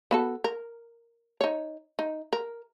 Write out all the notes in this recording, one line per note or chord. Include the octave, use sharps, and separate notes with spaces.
B3 F#4 A4
A#4
D#4 C#5
D#4
A#4